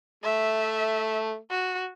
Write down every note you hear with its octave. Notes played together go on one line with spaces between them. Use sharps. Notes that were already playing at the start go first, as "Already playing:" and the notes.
A3 E5
F#4